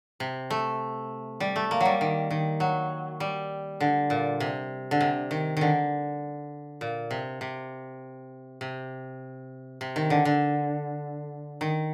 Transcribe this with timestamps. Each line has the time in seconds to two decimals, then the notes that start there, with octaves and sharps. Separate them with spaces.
0.20 C3
0.50 A3
1.40 G3
1.56 A3
1.71 A#3
1.81 F#3 G3
2.01 D#3
2.30 D#3
2.60 F#3
3.20 G3
3.80 D3
4.10 A#2
4.40 C3
4.91 D3
5.01 C3
5.31 D#3
5.57 D3 D#3
6.81 A#2
7.11 C3
7.41 C3
8.61 C3
9.81 C3
9.96 D#3
10.10 D3
10.25 D3
11.61 D#3